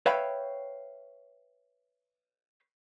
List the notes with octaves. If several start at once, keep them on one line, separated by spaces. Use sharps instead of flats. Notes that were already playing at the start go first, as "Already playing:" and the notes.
B4 C#5 E5 F5 G5 B5